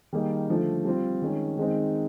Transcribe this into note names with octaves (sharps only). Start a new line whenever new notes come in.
D#3 G3 A#3 D#4 G#4
D3 F3 A3
G3 C4 F4
D#3 G#3 C#4
D#3 G#3 C4 D#4